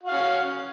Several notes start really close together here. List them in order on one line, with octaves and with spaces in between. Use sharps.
F#4 F5 C#4